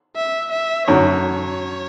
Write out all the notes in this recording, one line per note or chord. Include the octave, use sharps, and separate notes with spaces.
E5
E5
F#2 D3 F#3 C#5